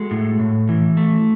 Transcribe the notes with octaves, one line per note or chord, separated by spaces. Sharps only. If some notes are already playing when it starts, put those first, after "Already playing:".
Already playing: G#3 F#4 A4
A2
A2
E3
A3